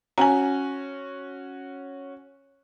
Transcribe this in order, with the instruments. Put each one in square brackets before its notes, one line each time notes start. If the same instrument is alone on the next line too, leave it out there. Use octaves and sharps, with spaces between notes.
[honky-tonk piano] C#4 F#4 [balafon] G#5 A#5